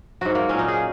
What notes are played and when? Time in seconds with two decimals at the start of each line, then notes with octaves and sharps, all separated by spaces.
0.21 G#2 F#3 F#4
0.35 A#3
0.49 A#2 F#3 C#4
0.59 D#4
0.68 G#4